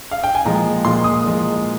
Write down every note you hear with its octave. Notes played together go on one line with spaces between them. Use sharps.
F5
G5
G#5
A#2 F3 G#3 A#5
A#2 F3 G#3 C6
D#6
A#2 F3 G#3